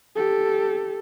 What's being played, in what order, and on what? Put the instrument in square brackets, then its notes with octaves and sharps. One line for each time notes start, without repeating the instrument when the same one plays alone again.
[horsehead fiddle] G4 A4